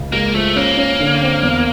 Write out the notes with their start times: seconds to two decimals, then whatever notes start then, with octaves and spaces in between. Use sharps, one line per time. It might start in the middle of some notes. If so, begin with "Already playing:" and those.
Already playing: C#2
0.12 G#3 A#3
0.34 F3 A3
0.56 A#3 C#4
0.77 C#4
1.00 D3
1.22 C4
1.43 E2